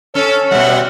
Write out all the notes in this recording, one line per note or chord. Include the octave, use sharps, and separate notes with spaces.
C#4 A4 C#5
B2 G3 E4 E5 F#5